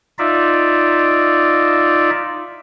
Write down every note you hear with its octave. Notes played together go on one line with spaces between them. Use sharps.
D#4 F4 D5 E5